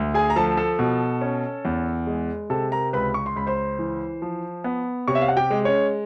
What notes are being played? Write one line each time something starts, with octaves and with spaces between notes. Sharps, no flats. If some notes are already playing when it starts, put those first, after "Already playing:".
Already playing: D2
G#4 G#5
A#5
F3 A4 A5
A4 A5
B2
C#4
E2
G#3
C3 A4 A5
A#4 A#5
C#2 B4 B5
C#6
C6
C#2 B5
C5 C6
E3
F3
B3
C3 C#5 C#6
E5
F5
F#5
G4 G5
G#3
C#4 C#5